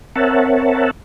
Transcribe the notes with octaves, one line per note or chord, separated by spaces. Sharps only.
C4 A#4 C#5 E5 F#5 A5